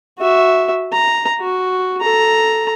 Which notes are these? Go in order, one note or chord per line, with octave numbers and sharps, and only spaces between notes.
F#4 E5
A#5
F#4
A4 A#5